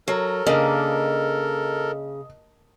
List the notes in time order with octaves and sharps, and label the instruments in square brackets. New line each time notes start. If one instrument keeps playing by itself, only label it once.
[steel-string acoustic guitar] F#3 [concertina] A4 A#4
[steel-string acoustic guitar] C#3 [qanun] A#3 D4 [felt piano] D#5